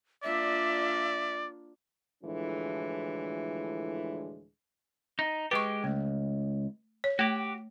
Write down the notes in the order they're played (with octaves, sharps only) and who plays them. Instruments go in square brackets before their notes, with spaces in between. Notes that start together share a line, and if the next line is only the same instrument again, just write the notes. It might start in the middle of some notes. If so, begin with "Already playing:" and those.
[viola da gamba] A#3 D4 F4 [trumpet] D5 [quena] E5
[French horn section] D2 A2 E3 F3 G#3 D4
[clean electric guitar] D#4
[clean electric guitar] G#3 G4 [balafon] B4 C#6
[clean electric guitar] C#2 [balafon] A3
[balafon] C#5
[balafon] A3 [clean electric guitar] F#4 G4